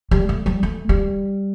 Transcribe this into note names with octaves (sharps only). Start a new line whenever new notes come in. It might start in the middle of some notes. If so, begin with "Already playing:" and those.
G3
A3
G3
A3
G3